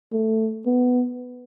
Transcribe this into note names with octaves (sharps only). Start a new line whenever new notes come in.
A3
B3